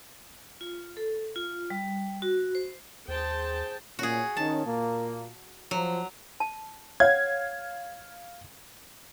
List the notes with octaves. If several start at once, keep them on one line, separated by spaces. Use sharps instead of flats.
F4
A4
F4
G3
F#4
C5
D#2 G#4 C5 G5 A5
A#2 C#4 F#4 G#4
D#3 C#4 A5
A#2 A#3
F3 F#3
A5
C#5 F5 F#5 G#6